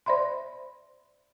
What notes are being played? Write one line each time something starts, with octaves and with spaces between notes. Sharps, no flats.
C5 D5 E5 B5 C6